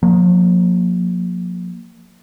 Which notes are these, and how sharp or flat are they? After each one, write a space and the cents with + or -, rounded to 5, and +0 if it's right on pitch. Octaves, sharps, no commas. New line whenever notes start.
F3 +45 A#3 +0